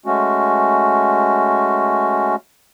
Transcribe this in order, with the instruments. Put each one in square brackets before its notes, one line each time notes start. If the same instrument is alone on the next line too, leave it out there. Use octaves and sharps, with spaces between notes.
[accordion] G#3 A3 C#4 F#4